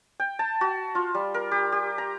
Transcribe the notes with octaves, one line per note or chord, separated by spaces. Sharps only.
G5
A5
F#4
F4
G3
A#4
G4
G4
A#5